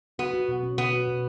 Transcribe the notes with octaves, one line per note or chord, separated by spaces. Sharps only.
B3 F#4
F#4
B2
C#4
B2 B3
F#4
B2